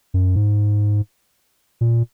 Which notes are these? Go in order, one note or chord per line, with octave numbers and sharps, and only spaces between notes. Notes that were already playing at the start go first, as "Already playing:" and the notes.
F#2
G#2
A#2